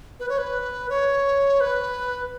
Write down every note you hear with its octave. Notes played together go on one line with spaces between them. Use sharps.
B4
C#5
B4
C#5
B4